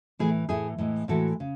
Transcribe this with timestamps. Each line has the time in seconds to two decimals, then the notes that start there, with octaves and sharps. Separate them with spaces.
0.19 A2 E3 A3 E4 G#4
0.49 A2 E3 A3 E4 G#4
0.78 A2 E3 G#3
1.08 A2 E3 G#3 F#4 A4
1.40 C#3